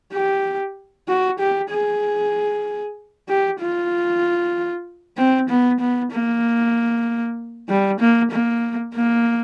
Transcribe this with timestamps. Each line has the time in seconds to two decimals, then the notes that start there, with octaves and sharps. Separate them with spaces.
0.13 G4
1.08 F#4
1.39 G4
1.71 G#4
3.28 G4
3.59 F4
5.17 C4
5.49 B3
5.80 B3
6.11 A#3
7.69 G3
8.00 A#3
8.31 A#3
8.95 A#3